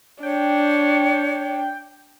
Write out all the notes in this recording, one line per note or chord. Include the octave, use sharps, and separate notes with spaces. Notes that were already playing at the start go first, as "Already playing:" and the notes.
D4 C#5 G5